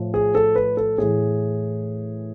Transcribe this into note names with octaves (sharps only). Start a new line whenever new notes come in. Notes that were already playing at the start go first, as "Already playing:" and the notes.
Already playing: A2 F3
G#4
A4
B4
A4
A2 E3 G#4